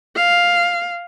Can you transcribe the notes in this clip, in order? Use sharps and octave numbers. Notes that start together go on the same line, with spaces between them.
F5